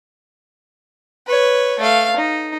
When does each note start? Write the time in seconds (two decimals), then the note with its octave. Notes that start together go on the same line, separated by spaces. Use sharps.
1.27 B4 C#5
1.80 A3 F5
2.16 D#4